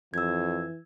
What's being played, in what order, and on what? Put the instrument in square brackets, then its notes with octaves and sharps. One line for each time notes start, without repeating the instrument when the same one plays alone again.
[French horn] F2 [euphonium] E3 [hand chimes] E6 G#6